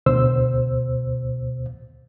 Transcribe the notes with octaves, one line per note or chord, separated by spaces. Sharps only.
D2 B2 C5 E6